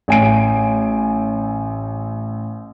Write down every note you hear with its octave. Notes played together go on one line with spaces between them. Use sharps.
A1 G#5 D7